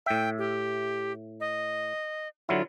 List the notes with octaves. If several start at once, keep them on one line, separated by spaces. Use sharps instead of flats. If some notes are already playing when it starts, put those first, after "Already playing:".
A2 E5 G5
G4
D#5
D3 F#3 E4 F4